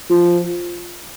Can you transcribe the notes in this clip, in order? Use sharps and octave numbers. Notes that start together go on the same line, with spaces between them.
F3